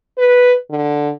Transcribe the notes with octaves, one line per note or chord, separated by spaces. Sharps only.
B4
D3